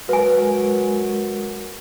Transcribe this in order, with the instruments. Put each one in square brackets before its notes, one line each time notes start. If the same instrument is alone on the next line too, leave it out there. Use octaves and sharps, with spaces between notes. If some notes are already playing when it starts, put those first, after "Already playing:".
[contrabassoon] F#3 [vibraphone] G#3 A#4 [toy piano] B4 G#5